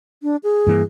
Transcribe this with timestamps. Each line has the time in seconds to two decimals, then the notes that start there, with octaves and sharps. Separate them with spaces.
0.23 D4
0.43 G#4
0.67 G2 E3 A#3